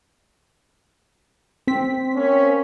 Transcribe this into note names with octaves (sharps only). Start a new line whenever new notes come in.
C4 B6
A#3 C#4